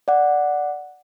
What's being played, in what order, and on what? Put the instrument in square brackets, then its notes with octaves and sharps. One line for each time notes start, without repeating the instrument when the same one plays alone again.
[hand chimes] D5 F#5